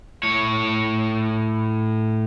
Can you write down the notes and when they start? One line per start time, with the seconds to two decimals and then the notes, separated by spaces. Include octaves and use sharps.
0.23 A2 C#5